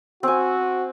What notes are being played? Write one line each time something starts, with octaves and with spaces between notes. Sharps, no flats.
C4 F#4 G#5